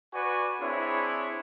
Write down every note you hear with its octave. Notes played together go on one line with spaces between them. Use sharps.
F#4 B4 D5 G#5 C#6
C4 D4 E4 G#4 C#5